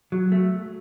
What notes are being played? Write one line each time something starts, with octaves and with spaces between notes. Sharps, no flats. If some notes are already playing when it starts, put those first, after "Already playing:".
F#3
A3